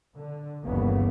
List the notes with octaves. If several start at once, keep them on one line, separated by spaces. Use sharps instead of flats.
D3
G1 D#2 C#3 E3 A#3 B3